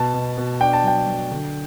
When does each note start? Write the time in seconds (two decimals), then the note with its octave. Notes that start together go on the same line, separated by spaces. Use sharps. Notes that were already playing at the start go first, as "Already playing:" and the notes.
Already playing: B2 A5
0.14 B2
0.38 B2
0.61 D4 G5
0.73 A5
0.84 F#3 G5
1.07 F#3
1.31 D3